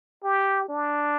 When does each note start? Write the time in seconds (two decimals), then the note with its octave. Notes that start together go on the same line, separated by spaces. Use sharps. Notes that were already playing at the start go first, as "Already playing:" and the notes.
0.24 G4
0.69 D4